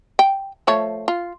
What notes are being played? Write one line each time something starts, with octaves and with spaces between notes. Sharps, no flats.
G5
F3 A3 C#5
F4